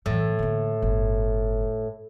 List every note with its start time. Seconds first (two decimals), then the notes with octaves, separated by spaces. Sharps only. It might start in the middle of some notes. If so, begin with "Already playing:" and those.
0.06 A2 E3 A3
0.39 D3 A#3
0.82 G1